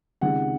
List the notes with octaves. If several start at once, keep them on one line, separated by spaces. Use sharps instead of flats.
C#2 C3 D#3 G#3 C#4 F#5